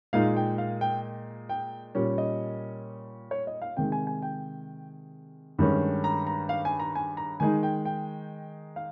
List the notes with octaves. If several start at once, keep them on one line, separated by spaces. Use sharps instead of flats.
A#2 G#3 D#4 F5
G5
F5
G5
G5
A#2 G3 C#4
D#5
C#5
D#5
F5
C3 D#3 G#3 G5
G#5
G#5
G5
G2 D#3 G#3 C#4
A#5
A#5
F5
G#5
A#5
G#5
A#5
D#3 G#3 D#4 G#5
G5
G5
F5